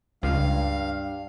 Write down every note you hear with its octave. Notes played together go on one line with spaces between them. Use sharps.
C#2 G2 F5